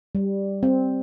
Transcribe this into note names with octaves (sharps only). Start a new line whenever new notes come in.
G3
C4